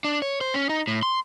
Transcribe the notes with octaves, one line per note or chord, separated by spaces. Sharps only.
D4
C#5
C5
C#4
D#4
A2
C6